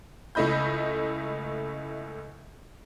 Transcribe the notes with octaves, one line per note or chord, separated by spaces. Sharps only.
C#2 A3 E4 D#5 B5 G6